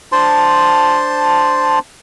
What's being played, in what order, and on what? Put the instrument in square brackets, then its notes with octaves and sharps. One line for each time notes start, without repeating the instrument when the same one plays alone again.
[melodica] D4 C5 A5 C6